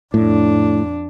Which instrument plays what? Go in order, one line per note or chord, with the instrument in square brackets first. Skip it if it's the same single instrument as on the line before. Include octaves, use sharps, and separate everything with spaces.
[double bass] F2 D4 [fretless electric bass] A2